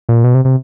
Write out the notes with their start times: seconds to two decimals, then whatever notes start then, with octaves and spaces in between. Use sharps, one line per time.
0.09 A#2
0.24 B2
0.35 C3
0.45 C3